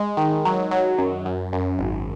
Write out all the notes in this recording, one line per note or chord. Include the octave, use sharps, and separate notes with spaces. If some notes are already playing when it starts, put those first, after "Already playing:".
Already playing: G#3
D#3
F#3
F#3
F#2
F#2
F#2
G#1